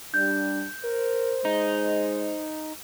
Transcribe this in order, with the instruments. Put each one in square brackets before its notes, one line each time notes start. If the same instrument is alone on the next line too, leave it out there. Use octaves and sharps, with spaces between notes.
[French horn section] G3 D4 [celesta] G6
[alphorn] A#4 [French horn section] C5
[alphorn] G#3 [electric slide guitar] D#4